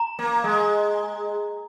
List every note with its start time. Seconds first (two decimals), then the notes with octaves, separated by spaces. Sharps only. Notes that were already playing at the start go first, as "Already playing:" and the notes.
Already playing: A#5
0.19 A#3
0.44 G#3